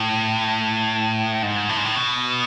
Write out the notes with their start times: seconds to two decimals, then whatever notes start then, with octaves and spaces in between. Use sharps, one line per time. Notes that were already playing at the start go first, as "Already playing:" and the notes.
Already playing: A2
1.43 G#2
1.69 A2
1.77 G#2
1.85 A2
1.96 B2